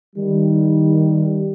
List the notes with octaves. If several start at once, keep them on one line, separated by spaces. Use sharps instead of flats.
D#3 G3